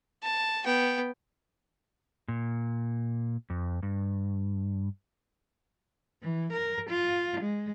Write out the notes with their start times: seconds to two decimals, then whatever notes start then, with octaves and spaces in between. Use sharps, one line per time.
0.23 A5
0.65 B3 G5
2.28 A#2
3.50 F2
3.82 G2
6.22 E3
6.53 A#4
6.90 F4
7.40 G#3